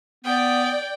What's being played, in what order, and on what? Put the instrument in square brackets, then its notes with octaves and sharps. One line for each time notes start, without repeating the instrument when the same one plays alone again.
[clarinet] B3 [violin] D5 G5